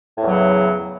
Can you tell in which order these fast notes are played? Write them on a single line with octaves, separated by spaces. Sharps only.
A2 E2 F#3 C#3